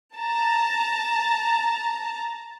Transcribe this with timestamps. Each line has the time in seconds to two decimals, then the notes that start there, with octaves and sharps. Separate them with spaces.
0.18 A5 A#5